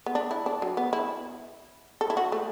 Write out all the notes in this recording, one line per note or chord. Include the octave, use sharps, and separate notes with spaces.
B3
D4
E4
D4
F#3
B3
E4
A4
E4
F#4
A3